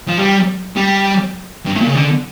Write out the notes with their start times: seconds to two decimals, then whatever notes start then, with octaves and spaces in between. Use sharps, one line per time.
0.08 F3
0.17 G3
0.76 G3
1.66 G2
1.73 A2
1.81 A#2
1.88 C#3
1.95 D3